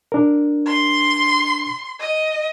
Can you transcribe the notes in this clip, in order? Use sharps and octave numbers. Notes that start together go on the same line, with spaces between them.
D4 A#4
C6
D#5